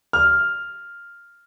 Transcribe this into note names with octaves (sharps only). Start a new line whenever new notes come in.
F6